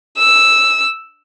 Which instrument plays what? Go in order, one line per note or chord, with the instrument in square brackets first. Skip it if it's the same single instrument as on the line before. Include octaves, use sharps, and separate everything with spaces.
[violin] E6